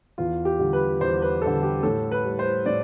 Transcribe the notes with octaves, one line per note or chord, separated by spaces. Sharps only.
E2 F4
G4
D3 G3
B4
E2 C5
B4
D3 G3 A4
G4
A2 A4
B4
G3
C5
A2 D5